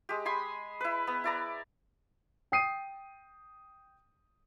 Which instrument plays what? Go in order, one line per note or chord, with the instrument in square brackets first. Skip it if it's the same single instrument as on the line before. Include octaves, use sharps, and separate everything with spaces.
[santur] G#3 G4
G#5 B5 C6 D#6
E4 B4
B3
E4 D5 A#5
[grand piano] G5 D#6 C7 D#7